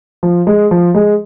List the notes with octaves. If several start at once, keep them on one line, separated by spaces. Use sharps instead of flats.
F3
G#3
F3
G#3